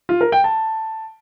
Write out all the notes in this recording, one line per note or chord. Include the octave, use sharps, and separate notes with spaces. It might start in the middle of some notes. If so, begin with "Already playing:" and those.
F4
A#4
G5
A5